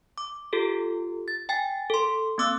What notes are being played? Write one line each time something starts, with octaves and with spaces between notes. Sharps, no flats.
D6
F4 G4 A4
A6
G5 G#5 A6
A4 C6
A#3 C4 D6 E6 F#6